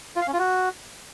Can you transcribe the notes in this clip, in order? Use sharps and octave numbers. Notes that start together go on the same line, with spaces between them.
F4
F5
C#4
F4
F#4